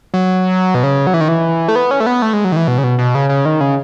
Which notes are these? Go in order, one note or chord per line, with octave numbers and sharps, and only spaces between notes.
F#3
B2
C#3
F#3
E3
D#3
E3
A3
B3
C#4
A3
B3
A3
G#3
F#3
D#3
E3
B2
C#3
B2
B2
C#3
C#3
D#3
C#3